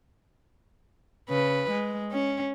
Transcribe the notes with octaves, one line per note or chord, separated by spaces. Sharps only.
C#3 B4
G#3
C#4